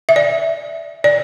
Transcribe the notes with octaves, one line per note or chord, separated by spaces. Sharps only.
E5
D5
D5